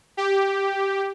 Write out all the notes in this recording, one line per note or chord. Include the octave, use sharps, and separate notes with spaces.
G4